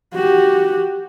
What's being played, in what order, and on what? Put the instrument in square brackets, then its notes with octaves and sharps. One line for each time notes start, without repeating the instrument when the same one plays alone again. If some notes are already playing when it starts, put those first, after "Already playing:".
[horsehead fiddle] F#4 G4